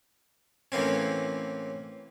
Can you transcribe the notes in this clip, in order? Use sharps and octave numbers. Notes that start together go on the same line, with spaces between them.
A2 E3 A#3 C4 C#4